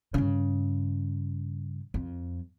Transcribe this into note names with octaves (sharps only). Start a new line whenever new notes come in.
G2 C#3
F2